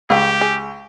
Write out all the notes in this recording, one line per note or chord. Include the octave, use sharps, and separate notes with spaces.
C#2 G3 F4 G4
G#4